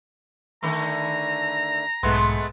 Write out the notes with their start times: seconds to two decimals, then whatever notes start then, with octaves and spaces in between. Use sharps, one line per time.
0.62 D3 D#3 A3 A#5
2.03 B1 G#2 G#3 A3 B3